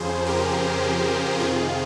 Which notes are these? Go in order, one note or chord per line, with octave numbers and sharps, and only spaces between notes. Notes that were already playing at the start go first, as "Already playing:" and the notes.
Already playing: F2 C#3 F3 G#4 C5
G4 A#4
F2 C3 D#3 F4 G#4